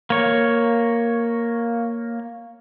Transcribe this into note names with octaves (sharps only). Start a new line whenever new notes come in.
A#3 C#5